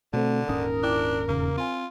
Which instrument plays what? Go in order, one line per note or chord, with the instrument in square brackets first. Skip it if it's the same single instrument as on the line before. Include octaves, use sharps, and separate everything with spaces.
[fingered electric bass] B2 [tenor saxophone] D3 [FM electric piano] A3 C4 A4
[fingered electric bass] D#1 G#2 C#4 [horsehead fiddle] A#4 [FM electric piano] D#6
[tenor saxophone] D4 [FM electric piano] E4 G5 D6
[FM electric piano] E2 C#3 [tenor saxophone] A#3
[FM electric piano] C4 G#5 [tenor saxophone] F4